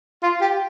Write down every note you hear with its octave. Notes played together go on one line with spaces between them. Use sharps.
F4
G4